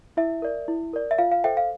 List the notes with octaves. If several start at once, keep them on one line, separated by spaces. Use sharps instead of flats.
E4 E5
A#4 D5
E4
A#4 D5
E5
F4 F5
F5
A4 C5 E5 G5
F5